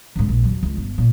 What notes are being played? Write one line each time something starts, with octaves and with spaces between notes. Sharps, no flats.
G#2 D3
A#1
D#2 F#3
C#2
G1
A#2